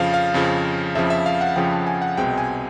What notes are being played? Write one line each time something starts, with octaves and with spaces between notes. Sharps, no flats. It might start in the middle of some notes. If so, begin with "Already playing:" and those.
Already playing: F2 C#3 F3 F5
F5
F2 C#3 F3
F2 C#3 F3 E5
E5
F5
F#5
F2 C#3 F3 G5
A5
G#5
F#5
C2 B2 G#3 C4 G5
G#5